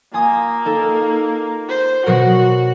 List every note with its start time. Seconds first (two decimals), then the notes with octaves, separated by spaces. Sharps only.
0.14 A#3 F4 G#5 D#6
0.65 D#4 A4
1.69 C5
2.06 B2 F#3 F#4 A#4